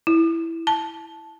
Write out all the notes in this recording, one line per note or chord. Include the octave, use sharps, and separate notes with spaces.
E4
A5